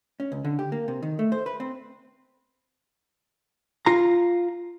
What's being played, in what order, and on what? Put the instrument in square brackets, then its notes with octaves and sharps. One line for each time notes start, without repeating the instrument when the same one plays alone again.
[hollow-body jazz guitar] C#4
C#2
D3
G4
A#3
C3
D#3
A3
C5
B4
C4
F4 A#5